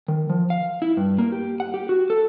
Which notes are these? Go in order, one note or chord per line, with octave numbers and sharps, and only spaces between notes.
D#3
F3
F5
E4
G2
A#3
G4
F#5
G4
F#4
A4